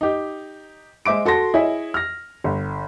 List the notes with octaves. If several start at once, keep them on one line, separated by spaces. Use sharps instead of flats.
D#4 G4
G#3 C5 E5 D6 D7
F#4 A4 A5 C6 A#6
E4 G#4 C#5 D#5 E5
F6 A#6
G1